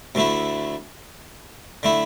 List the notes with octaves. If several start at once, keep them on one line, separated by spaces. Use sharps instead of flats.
D2 D3 A3 E4
D3 A3 E4